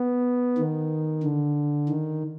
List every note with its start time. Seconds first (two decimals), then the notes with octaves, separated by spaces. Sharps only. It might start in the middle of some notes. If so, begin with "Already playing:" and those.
Already playing: B3
0.58 D#3
1.23 D3
1.89 D#3